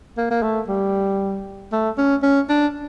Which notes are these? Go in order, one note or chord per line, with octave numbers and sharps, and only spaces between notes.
A#3
A#3
A3
G3
A3
C#4
C#4
D4